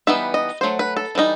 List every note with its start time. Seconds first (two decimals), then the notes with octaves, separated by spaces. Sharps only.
0.07 E3 G3 B3 D#4 E5
0.34 D#5
0.61 F#3 A3 C5
0.79 B4
0.97 A4
1.15 E3 G3 D#4